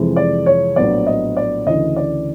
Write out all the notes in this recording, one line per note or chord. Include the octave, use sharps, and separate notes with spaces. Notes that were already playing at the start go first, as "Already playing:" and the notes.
Already playing: F2 C3 E3 G#3
D5
C#5
A#1 A2 F#3 B3 D5
D#5
D5
D2 C#3 E3 D#5
D5